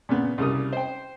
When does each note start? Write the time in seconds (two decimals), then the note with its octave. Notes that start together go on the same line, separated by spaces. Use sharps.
0.09 A#2 C#3 B3
0.38 C2 C#3 G3 A#4 D#6
0.73 C5 G5